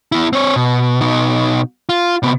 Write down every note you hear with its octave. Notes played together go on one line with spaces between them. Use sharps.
B3 E4
C4 C#5
B2
B2 D#4
F4
C3 B3